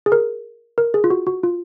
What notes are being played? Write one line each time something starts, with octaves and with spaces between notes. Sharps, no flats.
G#4
A#4
A#4
G#4
F4
F#4
F#4
F4